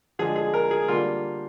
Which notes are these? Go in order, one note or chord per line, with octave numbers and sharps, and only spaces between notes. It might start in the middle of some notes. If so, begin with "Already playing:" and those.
D3 F3 G#3 G#4
G#4
A#4
G#4
D3 G3 A#3 F4